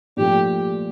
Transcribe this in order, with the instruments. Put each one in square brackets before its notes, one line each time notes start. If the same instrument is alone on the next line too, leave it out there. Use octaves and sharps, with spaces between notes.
[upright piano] A#2 F3 A3 [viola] G4